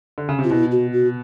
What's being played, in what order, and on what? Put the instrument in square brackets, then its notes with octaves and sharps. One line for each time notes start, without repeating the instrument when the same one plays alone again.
[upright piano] D3
C#3
C3
[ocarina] F4
[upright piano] B2 [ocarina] E4
[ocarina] F#4
F#4